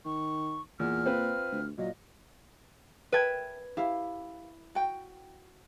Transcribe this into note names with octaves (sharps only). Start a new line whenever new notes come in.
D#3 C#6
E2 A#2 F6
C4 F4 B4
D2
A#2 F#3 D#5
B4 E5 G5 A5 G#6
E4 G4 F5
F#4 G5